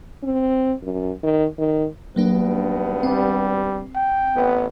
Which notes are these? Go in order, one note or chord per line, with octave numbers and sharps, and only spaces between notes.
C4
F#2
D#3
D#3
G#1 G2 F#3 A#3 B3 D4
G3 C4
G5
A1 B3